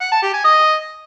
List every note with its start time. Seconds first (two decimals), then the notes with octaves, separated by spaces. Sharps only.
0.01 F#5
0.12 A5
0.23 G4
0.34 G#5
0.45 D#5